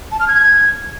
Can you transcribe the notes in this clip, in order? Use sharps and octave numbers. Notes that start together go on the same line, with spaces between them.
A5
F6
G#6